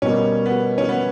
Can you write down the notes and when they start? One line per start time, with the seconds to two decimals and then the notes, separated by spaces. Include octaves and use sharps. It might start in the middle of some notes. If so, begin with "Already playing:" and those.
0.02 B2 G3 A#3 C#4
0.46 B3
0.78 C#4
0.89 B3